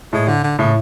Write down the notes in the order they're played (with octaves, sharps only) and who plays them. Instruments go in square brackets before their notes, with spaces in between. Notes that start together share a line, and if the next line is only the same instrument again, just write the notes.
[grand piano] A2 [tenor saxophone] G#3
[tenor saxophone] D3
D3
[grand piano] A2 [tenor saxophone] C#3